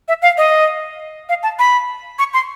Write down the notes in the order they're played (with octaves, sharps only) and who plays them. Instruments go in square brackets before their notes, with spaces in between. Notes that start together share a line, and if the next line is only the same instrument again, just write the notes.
[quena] E5
F5
D#5
F5
A5
B5
C#6
C6